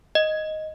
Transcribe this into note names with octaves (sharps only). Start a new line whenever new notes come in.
D#5